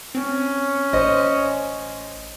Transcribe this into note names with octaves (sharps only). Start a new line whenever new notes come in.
C4 C#4
A1 C5 D#5